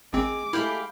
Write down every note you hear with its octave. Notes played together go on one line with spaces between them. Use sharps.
G#1 G#3 C4 D6
G#3 A3 E4 G4 F5 G5 B5